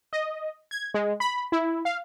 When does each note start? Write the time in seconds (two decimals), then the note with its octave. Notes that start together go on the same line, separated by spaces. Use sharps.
0.13 D#5
0.71 G#6
0.94 G#3
1.20 B5
1.52 E4
1.85 F5